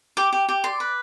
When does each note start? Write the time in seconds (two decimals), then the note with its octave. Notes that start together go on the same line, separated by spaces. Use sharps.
0.17 G4 D6
0.33 G4
0.49 G4
0.64 D5 C6
0.80 B4